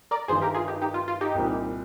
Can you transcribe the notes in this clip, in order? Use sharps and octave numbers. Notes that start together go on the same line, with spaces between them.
A#4 D5
G1 G2 D#3 G#4 C5
G4 A#4
F4 G#4
D#4 G4
D#4 G4
F4
F4
D#4 G4
C2 A#2 G3 C4